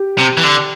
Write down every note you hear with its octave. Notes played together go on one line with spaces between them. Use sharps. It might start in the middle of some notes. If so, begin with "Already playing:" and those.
Already playing: G4
C3
E3
D3